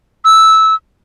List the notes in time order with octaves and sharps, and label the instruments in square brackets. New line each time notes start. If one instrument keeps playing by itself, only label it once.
[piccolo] E6